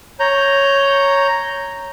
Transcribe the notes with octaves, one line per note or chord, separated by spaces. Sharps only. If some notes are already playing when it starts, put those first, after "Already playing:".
C#5 A#5 G6